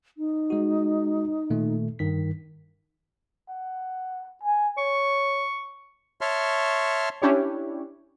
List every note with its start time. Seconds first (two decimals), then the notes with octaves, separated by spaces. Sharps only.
0.17 D#4
0.50 G#3 F#4
1.50 A#2 D#3 A3
1.99 G2 D#3 B6
3.49 F#5
4.43 G#5
4.78 C#5 C#6
6.21 C#5 E5 A5 C6 C#6 F6
7.22 C#4 D4 E4 G4 C#5